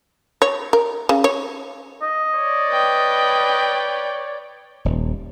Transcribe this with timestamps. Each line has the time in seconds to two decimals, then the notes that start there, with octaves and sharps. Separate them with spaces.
0.42 C#5
0.73 A#4
1.09 C#3
1.24 C#5
2.02 D#5
2.35 C#5 D5
2.69 B4 G5
4.85 D#1